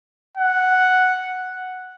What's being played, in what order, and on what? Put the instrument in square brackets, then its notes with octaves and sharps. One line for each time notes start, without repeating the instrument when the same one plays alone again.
[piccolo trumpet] F#5